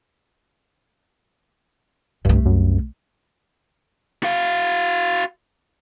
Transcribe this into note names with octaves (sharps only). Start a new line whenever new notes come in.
C2 G2 A3
F#2
F#4 F5